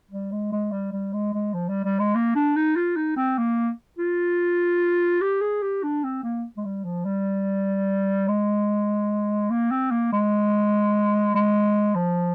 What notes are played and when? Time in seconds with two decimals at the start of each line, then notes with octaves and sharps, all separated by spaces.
0.11 G3
0.32 G#3
0.52 G#3
0.71 G3
0.92 G3
1.13 G#3
1.33 G#3
1.54 F3
1.69 G3
1.84 G3
1.99 G#3
2.15 A#3
2.35 D4
2.56 D#4
2.76 F4
2.96 D#4
3.16 C4
3.38 A#3
3.98 F4
5.21 G4
5.41 G#4
5.62 G4
5.83 D4
6.04 C4
6.23 A#3
6.57 G#3
6.65 G3
6.84 F3
7.05 G3
8.28 G#3
9.50 A#3
9.71 C4
9.91 A#3
10.12 G#3
11.34 G#3
11.95 F3